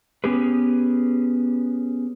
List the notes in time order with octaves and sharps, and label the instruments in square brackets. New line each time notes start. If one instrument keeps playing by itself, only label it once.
[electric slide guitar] B3 C#4 G4 G#4 B4